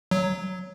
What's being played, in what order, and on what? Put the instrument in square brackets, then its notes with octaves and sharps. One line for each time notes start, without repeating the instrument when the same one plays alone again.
[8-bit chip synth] F#3